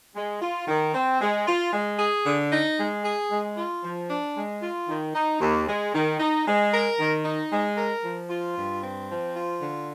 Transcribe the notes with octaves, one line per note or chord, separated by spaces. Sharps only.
G#3
F4
D#3
C4
G#3
F4
G#3
G#4
D3
D#4
G#3
G#4
G#3
F4
F3
D4
G#3
F4
D#3
D#4
D#2
G#3
D#3
D#4
G#3
A#4
D#3
D#4
G#3
A#4
F3
F4
G2
C4
F3
F4
D3